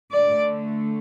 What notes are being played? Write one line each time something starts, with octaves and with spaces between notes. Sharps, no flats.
D3 A3 D5